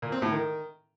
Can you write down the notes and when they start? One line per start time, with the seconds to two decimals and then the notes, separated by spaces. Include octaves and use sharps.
0.02 A#2
0.12 C4
0.22 A2
0.32 D#3